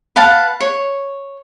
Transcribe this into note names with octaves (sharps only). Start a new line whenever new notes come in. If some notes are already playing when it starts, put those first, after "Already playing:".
B4 F5 F#5 A5
C#5